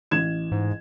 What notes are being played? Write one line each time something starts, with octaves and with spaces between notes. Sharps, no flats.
A1 G#6 E7
G#2